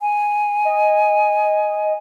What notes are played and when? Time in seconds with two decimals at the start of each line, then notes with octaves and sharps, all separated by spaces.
0.01 G#5
0.65 D#5